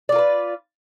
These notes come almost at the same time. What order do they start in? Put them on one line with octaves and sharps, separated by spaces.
D5 F4 A#4 B4